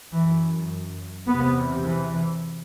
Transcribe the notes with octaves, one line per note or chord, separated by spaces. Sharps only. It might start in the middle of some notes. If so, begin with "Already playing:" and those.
F#2 E3
E2 C3 B3
E3